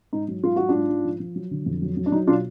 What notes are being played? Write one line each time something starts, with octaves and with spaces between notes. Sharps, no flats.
G#2 D#4
F#3
G#2 F4
F#3 F#4
D4 F4
G#2
G#2
F3
F3
F#3
D3
F2
F#3
F#3
D4
F#3 D#4
B2 D4 F4